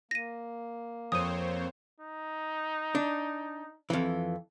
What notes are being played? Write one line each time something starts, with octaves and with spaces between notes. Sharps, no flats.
A#3 A#6 D#7
F2 C4 C5 C#5 D#6 D#7
D#4
D4
F2 E3